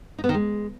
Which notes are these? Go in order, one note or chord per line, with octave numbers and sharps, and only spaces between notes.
D#4
B3
D#3
G#3